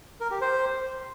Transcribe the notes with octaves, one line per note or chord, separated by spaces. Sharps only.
A#4
G4
C5